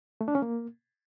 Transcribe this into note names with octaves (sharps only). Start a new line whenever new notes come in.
A3
D4
C#4
A#3